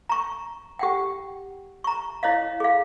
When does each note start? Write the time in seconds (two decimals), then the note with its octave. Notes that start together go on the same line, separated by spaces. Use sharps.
0.09 A#5 C#6
0.79 G4 F#5 G5
1.84 A#5 C#6
2.23 E4 C#5 D#5 F5
2.60 G#4 F5